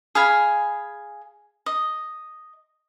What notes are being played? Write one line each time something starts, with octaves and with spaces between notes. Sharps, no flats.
G#4 F5 G#5 B5
D#5